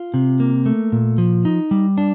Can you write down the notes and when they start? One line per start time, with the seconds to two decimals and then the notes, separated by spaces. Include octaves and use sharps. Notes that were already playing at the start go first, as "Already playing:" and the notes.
Already playing: F4
0.14 C3
0.40 A#3
0.66 A3
0.92 A#2
1.18 F3
1.45 D#4
1.71 G3
1.98 D4